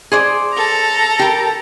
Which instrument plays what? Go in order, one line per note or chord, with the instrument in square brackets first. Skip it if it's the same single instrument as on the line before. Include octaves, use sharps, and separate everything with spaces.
[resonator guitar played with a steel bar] G#4 C5 D5
[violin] A4 A#5
[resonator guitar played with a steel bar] G4 A#4